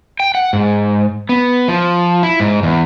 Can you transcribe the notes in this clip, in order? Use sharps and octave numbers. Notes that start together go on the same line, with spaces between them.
G5
F#5
G#2
B3
F3
E4
G#2
E2